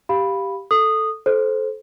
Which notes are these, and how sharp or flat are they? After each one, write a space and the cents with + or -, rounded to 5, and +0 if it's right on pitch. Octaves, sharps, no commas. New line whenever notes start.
G4 +0 F5 +0 B5 -5
A4 +0 D#6 -10
A4 -20 C5 +0